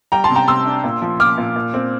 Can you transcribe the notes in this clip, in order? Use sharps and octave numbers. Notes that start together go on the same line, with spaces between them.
G3 G5 A#5
A5 C6
C3
G5 A#5
C3 C6 E6
D4
A#2
F3
A#2 D6 F6
A#2
A#2
C4